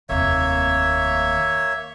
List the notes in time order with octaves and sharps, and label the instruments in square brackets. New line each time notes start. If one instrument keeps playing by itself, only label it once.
[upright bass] F1 D#2 [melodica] A#3 C#5 E5